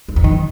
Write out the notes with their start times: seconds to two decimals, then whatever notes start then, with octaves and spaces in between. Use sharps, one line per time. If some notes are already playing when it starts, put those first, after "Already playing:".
0.08 E2
0.16 F2
0.24 F#2 D#3